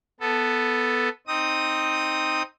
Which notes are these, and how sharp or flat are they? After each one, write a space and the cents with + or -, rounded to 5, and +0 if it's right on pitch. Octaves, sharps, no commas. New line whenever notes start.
B3 +0 A4 +0
C4 +0 D#4 +0 D#6 +0